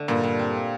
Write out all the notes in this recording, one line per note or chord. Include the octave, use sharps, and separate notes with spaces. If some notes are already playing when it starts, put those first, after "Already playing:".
Already playing: D3 A3
G2 A#2
G2
C4